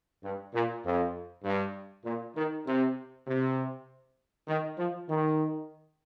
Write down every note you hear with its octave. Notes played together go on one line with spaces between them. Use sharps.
G2
A#2
F2
G2
A#2
D#3
C3
C3
D#3
F3
D#3